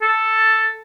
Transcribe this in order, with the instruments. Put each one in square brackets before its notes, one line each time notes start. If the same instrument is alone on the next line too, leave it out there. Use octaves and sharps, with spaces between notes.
[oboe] A4